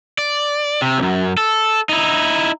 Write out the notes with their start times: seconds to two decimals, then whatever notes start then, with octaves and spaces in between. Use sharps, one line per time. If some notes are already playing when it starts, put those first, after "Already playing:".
0.18 D5
0.82 C3
0.98 B1 F#2
1.38 A4
1.89 D#4 E4